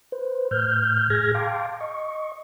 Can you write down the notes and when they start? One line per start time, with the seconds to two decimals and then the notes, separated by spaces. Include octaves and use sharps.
0.12 B4 C5
0.51 A2 F6 G6
1.10 A2 G#4 F6 G#6 A#6
1.34 F5 G5 A5 C6 D6
1.80 D#5 C#6